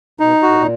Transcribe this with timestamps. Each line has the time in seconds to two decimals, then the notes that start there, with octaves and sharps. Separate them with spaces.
0.20 B2 D#4
0.42 A2 F#4
0.55 A#2